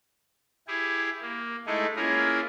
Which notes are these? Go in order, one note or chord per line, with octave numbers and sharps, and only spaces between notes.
E4 G4 G#4
A#3
G#3 A3 D#4 E4 G#4 A4
A#3 C#4 E4 F4 G#4 A#4